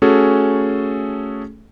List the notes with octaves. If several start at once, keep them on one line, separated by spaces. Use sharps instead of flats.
A3 C#4 F#4 G#4 A4